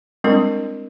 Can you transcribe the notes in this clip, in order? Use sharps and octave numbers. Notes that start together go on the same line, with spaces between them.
G3 G#3 C4 D4 E4 A#4